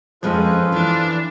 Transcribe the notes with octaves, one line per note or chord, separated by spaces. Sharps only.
F2 F3 G#3 C4 C#4 F4 A4 B4
E3 D4